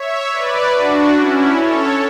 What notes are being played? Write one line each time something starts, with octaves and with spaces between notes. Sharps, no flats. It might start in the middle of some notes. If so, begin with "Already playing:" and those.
Already playing: C#5 E5
B4 D5
D4 F#4
C#4 E4
A4 C#5